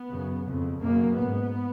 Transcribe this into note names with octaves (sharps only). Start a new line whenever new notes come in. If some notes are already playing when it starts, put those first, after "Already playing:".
Already playing: B3
F#2 C#3
F2 C#3
F#2 C#3 A#3
G#2 B3